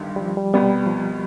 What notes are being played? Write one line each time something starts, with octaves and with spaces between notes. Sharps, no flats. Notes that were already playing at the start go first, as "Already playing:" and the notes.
Already playing: G1 G2 D#3 G3
G3
F3
G3
C2 B2 G3 B3
F3